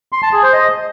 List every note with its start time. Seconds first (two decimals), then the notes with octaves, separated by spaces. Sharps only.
0.12 C6
0.23 A5
0.33 G#4
0.43 C5
0.53 D#5